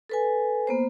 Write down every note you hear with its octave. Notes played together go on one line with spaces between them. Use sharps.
A4 B4 G#5
A#3 B3 C5